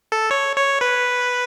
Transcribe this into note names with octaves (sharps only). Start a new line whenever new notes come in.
A4
C#5
C#5
B4